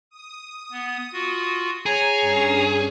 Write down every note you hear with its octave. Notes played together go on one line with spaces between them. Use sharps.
D#6
B3
F4 F#4
G#4 C#5 A#5
G2 C#4